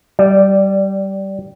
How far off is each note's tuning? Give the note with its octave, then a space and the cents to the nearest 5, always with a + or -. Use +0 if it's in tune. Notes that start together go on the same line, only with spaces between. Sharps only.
G3 -15 D5 +5